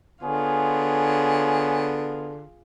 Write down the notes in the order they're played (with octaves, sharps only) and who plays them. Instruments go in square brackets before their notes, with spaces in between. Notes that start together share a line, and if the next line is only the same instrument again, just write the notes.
[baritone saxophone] D3 [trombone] B3 [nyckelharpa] F4 G#4 [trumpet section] C#5 G#5